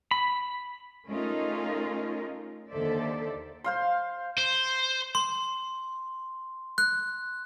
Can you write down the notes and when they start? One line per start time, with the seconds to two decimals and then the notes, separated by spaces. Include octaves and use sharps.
0.11 B5
1.08 A3 C#4 D#4 F4 G#4 A#4
2.70 D#2 D3 A4 C5 D5 E5
3.64 C5 F5 C6
4.38 C5
5.15 C6
6.78 F#6